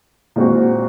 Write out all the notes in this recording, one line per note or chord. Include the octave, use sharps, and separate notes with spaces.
A#2 G#3 C4 F#4